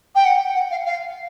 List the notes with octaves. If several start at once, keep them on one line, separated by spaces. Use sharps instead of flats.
G5
F#5
F#5
F5
F5